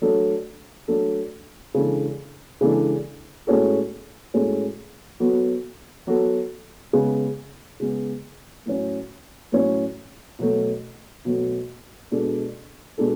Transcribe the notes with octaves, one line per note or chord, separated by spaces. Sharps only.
F#3 A3 D4 A4
F#3 A3 D4 A4
C#3 E3 G#3 D4 A4
C#3 E3 G#3 D4 A4
A2 G#3 C#4 F#4 A4
A2 G#3 C#4 F#4 A4
F#3 B3 F#4 A4
F#3 B3 F#4 A4
C#3 G#3 B3
C#3 G#3 B3
A2 F#3 C#4
A2 F#3 C#4
B2 F#3 A3
B2 F#3 A3
B2 G#3 D4 A4
B2 G#3 D4 A4